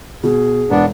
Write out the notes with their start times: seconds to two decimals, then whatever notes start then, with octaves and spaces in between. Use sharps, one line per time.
0.23 B2 G#4
0.70 E1 B3 D4